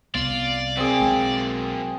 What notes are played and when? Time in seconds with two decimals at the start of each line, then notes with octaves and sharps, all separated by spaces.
0.15 C2 B3 F4 D5
0.77 F#2 A#3 C4 G#4
1.00 B1 G#3